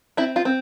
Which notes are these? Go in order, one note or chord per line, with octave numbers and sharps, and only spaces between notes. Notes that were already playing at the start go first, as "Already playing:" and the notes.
C4 E4
F4
C4